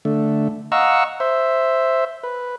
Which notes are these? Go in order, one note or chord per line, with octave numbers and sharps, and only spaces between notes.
D3 A3
D#5 F5 F#5 A#5 C#6 E6
C5 E5
B4